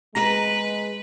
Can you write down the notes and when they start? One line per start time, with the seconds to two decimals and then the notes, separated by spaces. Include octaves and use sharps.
0.15 G#3 B4 A#5